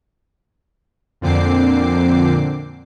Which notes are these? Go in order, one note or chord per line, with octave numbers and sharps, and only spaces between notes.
F2 A#2 D3 C4 D6 C7